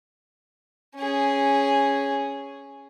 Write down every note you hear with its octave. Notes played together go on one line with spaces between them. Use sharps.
C#4 G#4